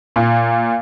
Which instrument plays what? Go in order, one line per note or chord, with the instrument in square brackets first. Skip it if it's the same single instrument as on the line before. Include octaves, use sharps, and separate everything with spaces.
[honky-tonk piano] A#2